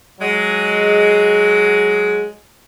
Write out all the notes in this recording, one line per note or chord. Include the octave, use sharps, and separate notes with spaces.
F#3 G#3